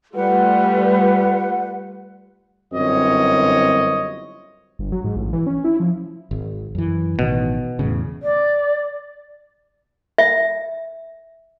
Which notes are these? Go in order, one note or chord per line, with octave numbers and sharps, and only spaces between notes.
G3 A3 F4 B4 F#5
G1 F#2 C4 E4 C#5 D#5
G1
F#3
G#2
A1
E3
C#4
E4
F3
G#1
F#2 E3
A1 B2 D#3
E2 A2 C#3
D5
E5